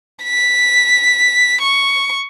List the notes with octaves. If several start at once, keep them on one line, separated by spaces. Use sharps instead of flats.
B6
C#6